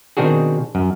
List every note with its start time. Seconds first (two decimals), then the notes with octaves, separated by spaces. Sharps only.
0.17 B2 D#3 C4 D4 F#4 G#4
0.75 F#2